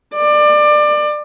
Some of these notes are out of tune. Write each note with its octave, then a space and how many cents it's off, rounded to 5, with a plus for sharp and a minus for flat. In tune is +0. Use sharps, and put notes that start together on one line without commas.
D5 +25